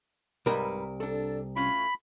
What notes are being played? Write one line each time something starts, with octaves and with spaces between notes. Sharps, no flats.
C2 G#2 G3 A#4 B4
D4 A4
A2 C#4 F4 B5